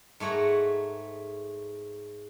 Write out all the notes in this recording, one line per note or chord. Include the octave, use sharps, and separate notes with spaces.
G#2 A3 C#5 F#5 A#5